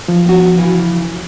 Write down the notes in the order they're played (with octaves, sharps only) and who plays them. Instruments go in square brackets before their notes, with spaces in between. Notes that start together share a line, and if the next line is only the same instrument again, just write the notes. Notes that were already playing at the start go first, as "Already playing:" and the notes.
[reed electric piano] F3
[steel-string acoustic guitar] B3 F#4
C#3 E3